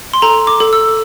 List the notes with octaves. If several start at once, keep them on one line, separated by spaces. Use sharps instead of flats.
C6
A4 A#5
D6
A4
E6